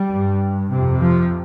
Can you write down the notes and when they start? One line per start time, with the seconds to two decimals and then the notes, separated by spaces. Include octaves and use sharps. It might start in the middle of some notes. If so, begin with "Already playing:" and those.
Already playing: G3
0.10 G2
0.70 F2 C3
1.01 F3